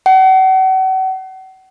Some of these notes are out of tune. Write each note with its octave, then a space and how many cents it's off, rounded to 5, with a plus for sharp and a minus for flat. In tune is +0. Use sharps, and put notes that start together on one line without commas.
F#5 +40